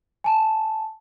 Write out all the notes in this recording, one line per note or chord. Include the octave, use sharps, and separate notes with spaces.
G#5 A5